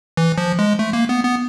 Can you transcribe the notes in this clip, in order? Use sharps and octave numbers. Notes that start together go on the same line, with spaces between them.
E3
F3
G#3
A3
A#3
B3
B3